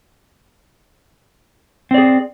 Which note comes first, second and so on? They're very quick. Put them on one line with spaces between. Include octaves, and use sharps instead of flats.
C4 D5 G#4